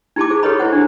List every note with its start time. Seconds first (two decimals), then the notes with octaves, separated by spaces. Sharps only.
0.16 D#4 E4 G4 A5 C6 D6
0.30 G#4 C5
0.43 G4 A4 B4 C#5 D#5 B5
0.58 E4 C5 F#5 C#6
0.72 D4 C5